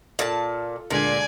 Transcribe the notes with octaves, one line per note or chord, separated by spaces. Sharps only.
A#2 F4 A4 A5
D2 A#2 D3 G#3 D5 G#5